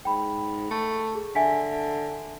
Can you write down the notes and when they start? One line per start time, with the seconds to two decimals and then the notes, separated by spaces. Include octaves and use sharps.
0.05 G#2 G5 B5
0.71 A3
1.15 G#4
1.35 D3 E5 G#5 B6